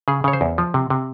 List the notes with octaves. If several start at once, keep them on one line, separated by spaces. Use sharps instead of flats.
C#3 G#4
C#3 C#5
C5
E2
F3
C3
C3